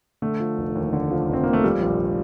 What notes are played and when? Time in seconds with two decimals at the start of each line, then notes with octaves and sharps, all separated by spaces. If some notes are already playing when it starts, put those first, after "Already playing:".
0.22 D3 A3
0.40 F3
0.58 F1
0.75 D#2
0.93 D3
1.10 F3
1.29 F1 C4
1.43 D#2 A#3
1.53 A3
1.63 F3 G3
1.81 A#1